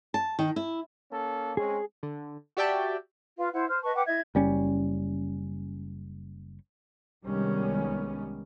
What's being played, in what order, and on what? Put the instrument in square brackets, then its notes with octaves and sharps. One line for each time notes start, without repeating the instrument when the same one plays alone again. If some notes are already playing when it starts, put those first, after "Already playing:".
[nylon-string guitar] A5
D#3
E4
[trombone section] A#3 C#4 A4
[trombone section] G#3 C4 C#4 [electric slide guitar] G#4
[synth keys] D3
F#4 G4 D5 E5 G5 A5
[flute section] F4 B4 F5
E4 C5 F#5
C5 F6
B4 D#5 A5 C#6
B4 F#5 G5 D6
E4 D#5 E5 G#6
[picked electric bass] F#1 G3 C#4
[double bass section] C2 D#3 G3 G#3 B3 C#4